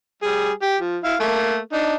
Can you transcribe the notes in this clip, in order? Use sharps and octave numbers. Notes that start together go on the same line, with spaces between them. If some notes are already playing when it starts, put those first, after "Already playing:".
G3 G#4
G4
F3
E4 F5
A3 A#3
D4 D#4